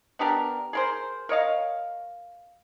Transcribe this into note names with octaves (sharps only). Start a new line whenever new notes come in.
B3 D4 G4 A#4
G#4 A#4 C5
A#4 C#5 D#5 F5